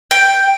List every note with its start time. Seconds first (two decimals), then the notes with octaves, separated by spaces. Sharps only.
0.11 G5